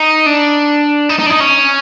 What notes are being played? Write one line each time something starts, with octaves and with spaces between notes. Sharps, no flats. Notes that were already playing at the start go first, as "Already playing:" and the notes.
Already playing: D#4
D4
D#4
D#4
D4
D#4
C#4